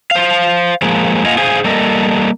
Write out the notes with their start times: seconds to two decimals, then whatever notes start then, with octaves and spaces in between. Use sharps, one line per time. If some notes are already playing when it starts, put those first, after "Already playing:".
0.11 C5 F5
0.82 F3 G#3 A#3
1.25 A#3 F4 D#5 F5 F#5 G#5
1.38 G#4 C5 F5 G#5
1.64 G3 A#3 A4 D#5